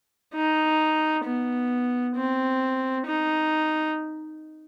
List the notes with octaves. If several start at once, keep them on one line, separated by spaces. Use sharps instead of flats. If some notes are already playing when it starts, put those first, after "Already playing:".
D#4
B3
C4
D#4